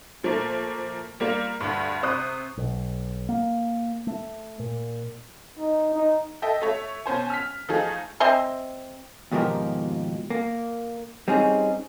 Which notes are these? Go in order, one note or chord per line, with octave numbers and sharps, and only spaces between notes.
A#2 F3 A3 A#3
G3 A#3 F4
D2 G2
C3 C5 C#6 D#6 F#6
B1
A#3
A3
A#2
D#4
D#4
A4 D#5 E5 G5
A3 C#5 E5
B2 C#4 C5 G#5
F6 B6
F3 A3 D#4 G#4
C4 D#5 E5 C6
D#2 G#2 B2 F3 G4 A#4
A#3
G3 C4 C#4 D#4 G#4